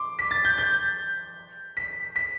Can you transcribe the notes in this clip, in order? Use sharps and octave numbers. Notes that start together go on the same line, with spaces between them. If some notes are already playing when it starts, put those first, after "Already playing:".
Already playing: C6 D6
B6
A6
G6
G6
B6
B6